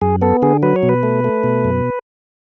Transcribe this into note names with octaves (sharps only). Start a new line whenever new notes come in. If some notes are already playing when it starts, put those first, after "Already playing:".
F#2 G#4
B3 A4
D3 G#4
F#3 B4
C#5
B2
B4
A3
A3
B2
F#2